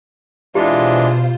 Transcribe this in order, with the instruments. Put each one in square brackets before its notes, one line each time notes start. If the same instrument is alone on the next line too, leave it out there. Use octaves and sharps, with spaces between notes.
[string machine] B2 C5 [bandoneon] E3 G#3 D4 [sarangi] F4 [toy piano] G4